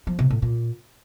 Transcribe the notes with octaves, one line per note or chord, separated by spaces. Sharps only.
F3
C3
A2
A#2